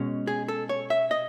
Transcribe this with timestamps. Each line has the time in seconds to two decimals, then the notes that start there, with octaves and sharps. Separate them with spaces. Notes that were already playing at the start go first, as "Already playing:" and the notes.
Already playing: B2 G#3 C#4
0.27 G#4
0.48 A4
0.69 C#5
0.90 E5
1.11 D#5